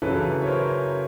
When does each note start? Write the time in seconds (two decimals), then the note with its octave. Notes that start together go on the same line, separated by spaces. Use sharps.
0.02 F#2 C#3 E3 A4 B4
0.42 C#5
0.47 A#4 C5